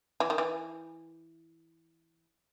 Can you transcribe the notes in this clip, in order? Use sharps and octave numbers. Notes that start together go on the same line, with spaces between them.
E3
D#3
E3